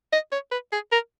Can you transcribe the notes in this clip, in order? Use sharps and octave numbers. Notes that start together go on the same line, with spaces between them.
D#5
C#5
B4
G#4
A#4